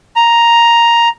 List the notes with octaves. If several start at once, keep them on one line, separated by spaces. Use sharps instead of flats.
A#5